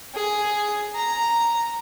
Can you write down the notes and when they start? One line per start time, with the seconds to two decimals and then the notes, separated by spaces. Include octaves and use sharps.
0.15 G#4
0.95 A#5